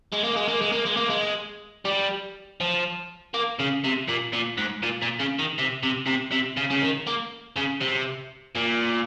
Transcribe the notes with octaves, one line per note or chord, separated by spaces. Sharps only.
G#3
A#3
G#3
A#3
G#3
A#3
G#3
A#3
G#3
G3
F3
A#3
C#3
C3
A#2
A#2
G#2
A#2
A#2
C#3
D#3
C3
C3
C3
C3
C#3
C#3
D#3
A#3
C#3
C3
A#2